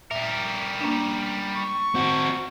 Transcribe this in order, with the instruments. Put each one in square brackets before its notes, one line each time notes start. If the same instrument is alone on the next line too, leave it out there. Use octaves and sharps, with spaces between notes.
[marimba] A#2 E5 [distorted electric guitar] G3 A#4
[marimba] A#3 C#4 D4
[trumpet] C#6
[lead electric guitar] C4 F#4